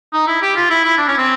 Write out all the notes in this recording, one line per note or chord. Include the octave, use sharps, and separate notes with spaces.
D#4
E4
G4
F4
E4
E4
D4
C#4
C4